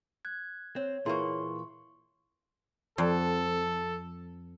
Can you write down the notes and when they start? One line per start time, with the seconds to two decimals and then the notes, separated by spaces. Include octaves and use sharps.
0.25 F#6 G#6
0.76 C4 C#5
1.06 A#2 E3 A#3 E4 G#4 B4 C6 C#6
2.98 F2 A4